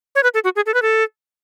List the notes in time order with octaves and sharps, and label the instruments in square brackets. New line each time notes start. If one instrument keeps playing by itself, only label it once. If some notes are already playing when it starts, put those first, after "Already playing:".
[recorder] C#5
B4
A4
F#4
G#4
A4
B4
A4